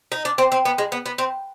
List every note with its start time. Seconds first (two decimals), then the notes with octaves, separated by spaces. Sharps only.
0.12 D#4
0.25 D4
0.38 C4
0.52 C4
0.65 B3
0.78 G#3
0.92 B3
1.06 B3
1.18 C4